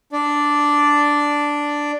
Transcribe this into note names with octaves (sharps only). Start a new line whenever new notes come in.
D4 D5